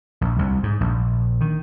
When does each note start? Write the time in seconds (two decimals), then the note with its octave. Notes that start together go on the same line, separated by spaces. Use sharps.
0.21 A#1
0.39 C2
0.63 G#2
0.81 A#1
1.41 D#3